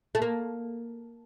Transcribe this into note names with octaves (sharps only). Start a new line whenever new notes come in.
A3
A#3